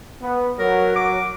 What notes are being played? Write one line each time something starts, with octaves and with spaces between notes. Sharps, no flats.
B3
F#3 A#4
D6